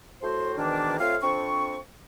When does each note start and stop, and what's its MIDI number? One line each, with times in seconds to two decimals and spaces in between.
0.23 0.56 45
0.23 0.56 66
0.23 0.56 72
0.57 0.98 44
0.57 0.98 47
0.57 0.98 51
0.57 0.98 52
0.57 0.98 58
0.57 0.98 62
1.00 1.16 57
1.00 1.16 60
1.00 1.16 65
1.00 1.16 73
1.00 1.16 77
1.22 1.77 41
1.22 1.77 60
1.22 1.77 62
1.22 1.77 85